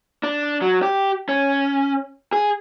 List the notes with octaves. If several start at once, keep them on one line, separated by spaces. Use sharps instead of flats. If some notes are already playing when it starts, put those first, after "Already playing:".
D4
F#3
G4
C#4
G#4